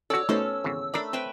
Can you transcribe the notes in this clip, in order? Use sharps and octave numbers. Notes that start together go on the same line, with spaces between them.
C#4 F#4 A4 C#5 D5 E6
B2 A3 C#4 D#4 A4 C5
G#1 E2 C#3
A3 D4 A#4 D5 B5
C4 B4 E5 G5